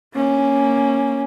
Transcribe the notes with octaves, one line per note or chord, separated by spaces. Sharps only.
A#3 C#4